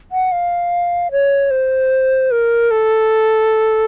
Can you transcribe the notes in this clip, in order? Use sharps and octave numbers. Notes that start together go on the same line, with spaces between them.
F#5
F5
C#5
C5
A#4
A4